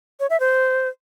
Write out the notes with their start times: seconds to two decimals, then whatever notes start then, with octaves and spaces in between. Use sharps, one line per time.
0.20 C#5
0.30 E5
0.40 C5